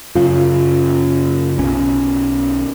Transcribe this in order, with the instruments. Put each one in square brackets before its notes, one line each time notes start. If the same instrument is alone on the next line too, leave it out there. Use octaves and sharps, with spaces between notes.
[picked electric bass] F#2 C#3 [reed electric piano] F4
[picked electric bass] B1 C#4